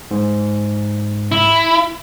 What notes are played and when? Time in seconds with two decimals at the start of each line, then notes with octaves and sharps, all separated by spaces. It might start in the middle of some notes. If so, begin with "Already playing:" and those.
0.11 G#2
1.32 E4